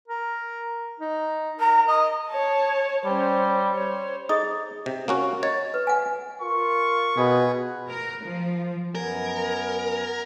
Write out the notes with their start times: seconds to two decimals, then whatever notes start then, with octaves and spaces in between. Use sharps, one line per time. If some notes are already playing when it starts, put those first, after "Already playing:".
0.08 A#4
1.00 D#4
1.59 A#4 A#5
1.87 D#5 D#6
2.29 C#5 A5
3.05 G3 C#4 C5
3.74 C5 C#5
4.29 D#4 G#4 D#5 D#6
4.86 C3
5.08 A#3 C#4 F#4
5.43 C#5 D#5
5.74 B4
5.87 F#5 G#5
6.42 F4 A#4 C#6
7.16 B2 F#4 G#4 B4
7.88 A#4
8.24 F3
8.95 F#2 B3 A#4 G#5